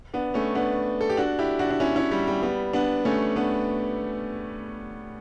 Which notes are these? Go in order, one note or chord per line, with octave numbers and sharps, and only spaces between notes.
B3 D4
A3 C#4
B3 D4
A4
G4
D4 F#4
E4 G4
D4 F#4
D4
C#4 E4
C#4 E4
G3
G3
G3 B3
B3 D4
A3 C#4
B3 D4